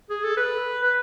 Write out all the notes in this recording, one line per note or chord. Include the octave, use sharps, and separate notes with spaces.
G#4
A4
B4
B4